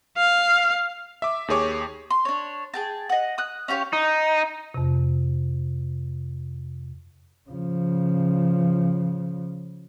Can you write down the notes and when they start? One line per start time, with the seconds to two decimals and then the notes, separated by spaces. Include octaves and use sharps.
0.17 F5
1.22 E5 D6
1.48 D#2 G4 G#4 C#5 D6
2.10 C6
2.25 D4 C#5
2.74 G#4 G5 A5
3.09 D#5 F#5
3.38 D#6 F#6
3.68 C#4 F4 G4 C#5
3.93 D#4
4.74 F2 C3
7.50 C#3 F3